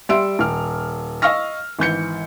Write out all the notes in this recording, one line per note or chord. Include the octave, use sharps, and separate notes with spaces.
G3 E5 C6 E6 D7
D#1 F6
D#5 F5 C#6 E6 F6 A#6
G#1 E3 G6 C#7